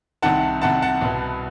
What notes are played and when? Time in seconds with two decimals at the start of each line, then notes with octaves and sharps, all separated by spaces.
0.22 C2 C3 D#3 F#5 A5
0.62 C2 C3 D#3 F#5 A5
0.82 F#5 A5
1.01 C2 B2